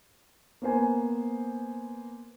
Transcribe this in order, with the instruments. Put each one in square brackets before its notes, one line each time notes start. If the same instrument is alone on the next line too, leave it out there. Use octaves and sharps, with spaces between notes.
[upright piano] A#3 B3 C5 G#5